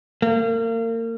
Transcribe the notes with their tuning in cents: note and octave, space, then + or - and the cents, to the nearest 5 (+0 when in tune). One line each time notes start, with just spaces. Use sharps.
A#3 -35